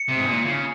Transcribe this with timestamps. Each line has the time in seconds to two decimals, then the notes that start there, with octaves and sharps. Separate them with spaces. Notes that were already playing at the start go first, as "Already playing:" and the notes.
Already playing: C#7
0.08 C3
0.17 G#2
0.27 A#2
0.45 C#3